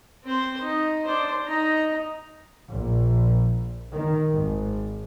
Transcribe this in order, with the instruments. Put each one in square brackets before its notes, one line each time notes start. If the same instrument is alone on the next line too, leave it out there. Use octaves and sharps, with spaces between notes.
[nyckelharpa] C4 C5
D#4
D4 C5
D#4 A#5
[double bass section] A#1
D#3
G#1